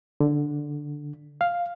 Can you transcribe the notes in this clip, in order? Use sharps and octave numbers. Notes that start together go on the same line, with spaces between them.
D3
F5